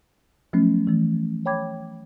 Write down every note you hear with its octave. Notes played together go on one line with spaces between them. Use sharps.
F3 F#3 A3 B3 C#4
E3 A3
C#5 G5 B5 D6 G#6